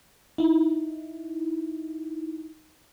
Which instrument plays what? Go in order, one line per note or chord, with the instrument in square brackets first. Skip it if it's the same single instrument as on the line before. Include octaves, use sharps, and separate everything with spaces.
[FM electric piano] D#4 E4